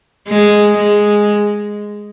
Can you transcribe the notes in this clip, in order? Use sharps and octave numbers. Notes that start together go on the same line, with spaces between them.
G#3
G#3